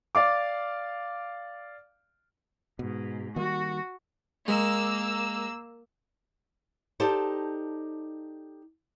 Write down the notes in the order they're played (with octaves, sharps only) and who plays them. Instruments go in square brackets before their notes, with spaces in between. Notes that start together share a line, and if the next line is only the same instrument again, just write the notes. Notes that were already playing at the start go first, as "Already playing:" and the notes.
[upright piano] D5 F5 D6
[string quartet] G#2 [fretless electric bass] B2
[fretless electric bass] D#3 G3 A#3 [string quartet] F#4
[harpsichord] G#3 [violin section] A#3 E6
[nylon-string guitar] D#4 G4 A4 C5 D5 A5